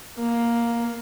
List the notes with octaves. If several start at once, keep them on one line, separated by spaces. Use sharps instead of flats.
A#3